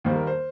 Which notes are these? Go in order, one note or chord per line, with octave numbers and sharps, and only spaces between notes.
D#2 D#3 G3 A#3 C5
A#4
C5